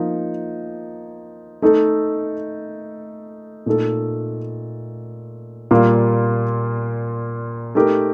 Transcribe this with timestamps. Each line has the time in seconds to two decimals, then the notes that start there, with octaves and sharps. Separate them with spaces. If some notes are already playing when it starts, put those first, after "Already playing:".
Already playing: F3 A#3 D#4
1.62 A3 D#4 A4
3.66 A#2 A3 D#4 A4
5.71 A#2 G3 A#3 F4
7.75 A3 D#4 G4 A#4